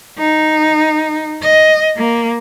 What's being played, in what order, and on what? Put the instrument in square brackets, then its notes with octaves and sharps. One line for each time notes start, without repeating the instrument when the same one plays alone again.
[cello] D#4
D#5
A#3